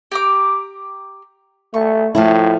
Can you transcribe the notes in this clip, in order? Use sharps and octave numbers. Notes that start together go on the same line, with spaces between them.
G4 A#5 D6
A3 C#6
A2 F3 A3 E4